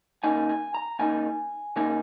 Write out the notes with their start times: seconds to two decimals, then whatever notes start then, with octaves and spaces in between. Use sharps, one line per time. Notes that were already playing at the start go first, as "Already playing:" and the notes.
0.24 C#3 A#3 D#4 G#5
0.49 G#5
0.74 A#5
0.99 C#3 A#3 D#4 G#5
1.76 C#3 A#3 D#4 G#5